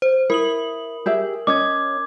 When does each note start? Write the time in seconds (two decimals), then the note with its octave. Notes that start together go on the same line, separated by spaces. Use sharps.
0.02 C5
0.30 E4 A#4 D#6 F#7
1.06 G4 G#4 E5
1.47 C#4 D#5 D6 G#6